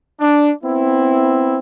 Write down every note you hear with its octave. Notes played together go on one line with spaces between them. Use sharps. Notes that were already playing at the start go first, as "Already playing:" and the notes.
D4
B3 C4 E4